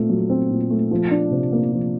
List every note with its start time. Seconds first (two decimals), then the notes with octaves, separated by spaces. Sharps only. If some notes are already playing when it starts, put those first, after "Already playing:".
Already playing: A#2 A3 C4
0.09 F#3
0.30 C4
0.51 A#2
0.70 A3
0.91 F3
1.11 D4
1.31 C3
1.52 A#3
1.73 F3